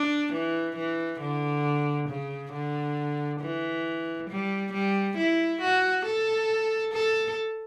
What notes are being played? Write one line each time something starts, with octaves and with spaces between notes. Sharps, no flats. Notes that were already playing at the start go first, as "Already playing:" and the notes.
Already playing: D4
E3
E3
D3
C#3
D3
E3
G3
G3
E4
F#4
A4
A4